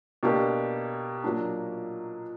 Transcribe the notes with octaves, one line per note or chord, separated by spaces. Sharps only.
B2 A#3 D4 G4
A#2 F#3 A#3 D4